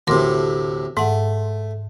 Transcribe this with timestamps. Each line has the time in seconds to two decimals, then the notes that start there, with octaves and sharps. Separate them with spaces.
0.07 D2 A2 C3 A#4 C6 D6
0.97 G#2 A3 F#5